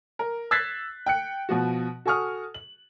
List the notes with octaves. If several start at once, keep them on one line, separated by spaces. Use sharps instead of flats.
A#4
E6 F#6 G#6 A6 B6 C7
G5 F#6 C#7
B2 F3 F#4
F#4 A4 G#5 C#6 D#6 F6
F#7